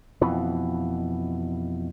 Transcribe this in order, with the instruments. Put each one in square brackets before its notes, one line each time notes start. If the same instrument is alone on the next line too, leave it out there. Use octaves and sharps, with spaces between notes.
[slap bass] F2 B2 E3